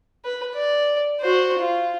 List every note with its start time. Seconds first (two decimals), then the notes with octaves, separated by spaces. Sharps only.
0.25 B4
0.55 D5
1.21 F#4 C5
1.59 F4